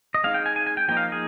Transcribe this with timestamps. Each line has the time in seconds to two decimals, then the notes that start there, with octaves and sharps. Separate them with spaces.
0.15 D#5
0.24 G#3 C4 D#4 F5
0.34 G5
0.46 G#5
0.56 G#5
0.67 G#5
0.77 G5
0.88 F3 A#3 D#4 G5
0.97 F5
1.12 G#4